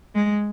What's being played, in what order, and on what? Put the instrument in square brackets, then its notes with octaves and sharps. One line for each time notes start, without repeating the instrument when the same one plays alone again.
[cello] G#3